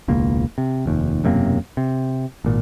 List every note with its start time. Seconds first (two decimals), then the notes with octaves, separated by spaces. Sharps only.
0.08 E1 C#2 A#3
0.58 C3
0.86 F1 D#2
1.24 E1 F#2 C3 A#3
1.77 C3
2.44 G#1 A#2